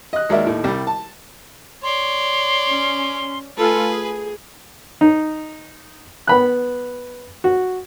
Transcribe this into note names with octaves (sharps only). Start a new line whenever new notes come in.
D#5 F#6
D#2 G#3 F#4 A#4 D5 E5
D#2 A2
C2 G3
A5
C#5 D5 C6
C#4
A3 F4 A4 B4 G#5
G#4
D#4
B3 B5 F#6
F#4